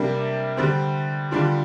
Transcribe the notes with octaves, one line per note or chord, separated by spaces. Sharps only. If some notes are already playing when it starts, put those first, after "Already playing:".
Already playing: C3 G3 A#3 D4
D3 G3 C4
D3 G3 D4 F4